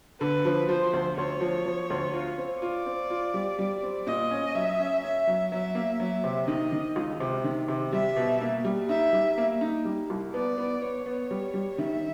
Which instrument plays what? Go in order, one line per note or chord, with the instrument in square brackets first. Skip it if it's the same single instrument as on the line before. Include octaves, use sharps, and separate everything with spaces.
[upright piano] D3 [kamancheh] B4
[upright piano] F3
[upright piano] F3 [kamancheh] C5
[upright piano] D2
[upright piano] D2 [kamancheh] C#5
[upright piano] F3
F3
D2
F4
C4
[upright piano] F4 [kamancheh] D5
[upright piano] C4
F4
G3
G3
C4
[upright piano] A#2 [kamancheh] D#5
[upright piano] C#4
[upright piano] F#3 [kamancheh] E5
[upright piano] C#4
[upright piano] C#4 [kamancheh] E5
[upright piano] F#3
[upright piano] F#3 [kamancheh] E5
[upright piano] A#3
[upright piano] F#3 [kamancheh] E5
[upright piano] C3
[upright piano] D#3 [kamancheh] D#5
[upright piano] D#3
C#2
C3
D#3
C3
[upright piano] G3 [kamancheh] E5
[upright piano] B2
A#3
G3
[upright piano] D#4 [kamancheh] E5
[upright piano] G3
A#3
D#4
G3
C2
[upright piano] B3 [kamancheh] D5
[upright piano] B3
[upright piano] B3 [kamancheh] C#5
[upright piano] B3
G3
G3
[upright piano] D#3 [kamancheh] E5